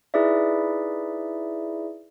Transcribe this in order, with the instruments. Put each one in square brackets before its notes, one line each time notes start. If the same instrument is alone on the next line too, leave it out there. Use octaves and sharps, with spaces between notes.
[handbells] D#4 E4 G#4 B4 D5 E5